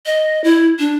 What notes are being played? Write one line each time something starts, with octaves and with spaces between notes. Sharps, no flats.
D#5
E4
D4